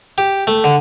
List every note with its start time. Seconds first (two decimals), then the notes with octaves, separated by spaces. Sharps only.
0.18 G4
0.47 A3
0.64 D3